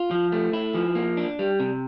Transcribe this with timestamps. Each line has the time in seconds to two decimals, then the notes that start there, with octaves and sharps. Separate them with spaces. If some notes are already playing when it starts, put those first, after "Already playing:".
Already playing: F4
0.11 F3
0.32 A3
0.53 E4
0.75 F3
0.95 A#3
1.17 D4
1.39 G3
1.60 C3